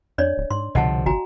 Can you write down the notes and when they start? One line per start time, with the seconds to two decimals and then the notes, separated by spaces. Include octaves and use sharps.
0.18 F2 D4 C#5 D5
0.38 D1
0.51 G#2 C6
0.75 C2 B2 D3 F3 D#5 F#5 A5
1.06 G#1 F#4 G#5 A#5